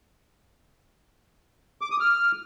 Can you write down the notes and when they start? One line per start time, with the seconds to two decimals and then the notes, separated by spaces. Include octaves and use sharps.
1.81 D6
1.91 D#6
2.00 F6